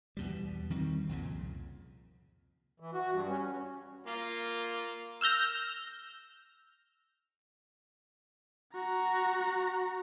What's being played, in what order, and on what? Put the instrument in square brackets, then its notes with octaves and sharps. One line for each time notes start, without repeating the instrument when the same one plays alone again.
[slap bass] E2 B2 G3
D#3 G3 C4
C2 F2 A#2 C#3
[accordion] E3
F#4
G2
C#4
[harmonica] A#3 F4
[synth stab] E6 F6 G6 A#6
[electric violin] F#4 A#5